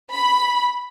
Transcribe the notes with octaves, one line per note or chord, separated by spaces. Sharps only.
B5